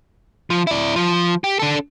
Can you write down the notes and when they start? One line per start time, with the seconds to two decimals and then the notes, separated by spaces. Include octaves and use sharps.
0.50 F3
0.67 E4 D5
0.96 F3
1.44 G4
1.59 D4 A4